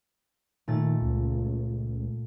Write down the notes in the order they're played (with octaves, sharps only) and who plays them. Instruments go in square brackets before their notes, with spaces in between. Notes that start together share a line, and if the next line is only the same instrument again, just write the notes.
[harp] A#2 A3 A6 [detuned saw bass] D#3
[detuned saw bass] C#2